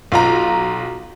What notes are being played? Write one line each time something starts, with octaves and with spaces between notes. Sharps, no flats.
B1 F4 A#5